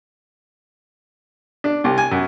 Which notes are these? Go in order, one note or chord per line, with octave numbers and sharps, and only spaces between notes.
D4
C2
G#5
F#2